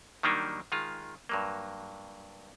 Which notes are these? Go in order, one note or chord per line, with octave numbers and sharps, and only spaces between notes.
D#3 F#3 G3 A#3 D4 D#4
D#3 G#3 F4
G2 F#3 A#3